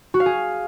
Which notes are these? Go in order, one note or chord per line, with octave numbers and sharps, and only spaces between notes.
F#4
F5
G#4